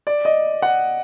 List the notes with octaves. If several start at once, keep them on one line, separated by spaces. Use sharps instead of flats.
D5
D#5
F#5